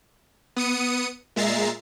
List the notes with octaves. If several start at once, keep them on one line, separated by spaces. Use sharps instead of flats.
B3 D#6 C#7 D#7
A#2 G#3 E5 A#5 A6 C7